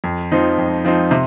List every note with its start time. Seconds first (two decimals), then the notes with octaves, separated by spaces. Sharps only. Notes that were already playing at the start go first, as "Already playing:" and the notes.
0.04 F2
0.32 F3 C4 D#4
0.58 F2
0.85 F3 C4 D#4
1.11 C3